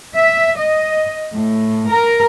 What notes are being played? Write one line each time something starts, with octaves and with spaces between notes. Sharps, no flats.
E5
D#5
A2
A#4